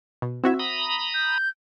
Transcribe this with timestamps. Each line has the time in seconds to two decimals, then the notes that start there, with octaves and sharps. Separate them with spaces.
0.22 B2
0.44 C4 E4 F#4 E5
0.59 A#5 B5 D#6
1.14 G6